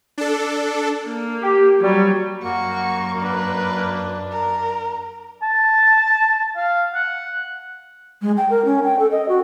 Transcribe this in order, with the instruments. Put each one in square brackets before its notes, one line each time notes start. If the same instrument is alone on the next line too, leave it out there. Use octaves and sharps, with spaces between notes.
[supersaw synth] D4 A4
[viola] A#3
[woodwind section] G4
[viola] F#3 [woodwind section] G3
[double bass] F#2 [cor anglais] A#3 [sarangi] F#4 [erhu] C#6
[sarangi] D4 [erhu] B4
[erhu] A#4
[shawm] A5
F5
F#5
[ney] G#3
G5
A#4
C#4
G5
A4
D#5
F#4